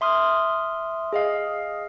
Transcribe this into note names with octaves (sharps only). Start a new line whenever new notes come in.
E5 C6 D#6 F6
G#4 D#5 F5